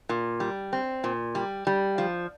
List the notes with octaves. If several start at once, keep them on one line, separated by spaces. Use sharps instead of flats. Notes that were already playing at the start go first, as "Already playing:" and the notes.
A#2
G3
C4
A#2
G3
G3
F3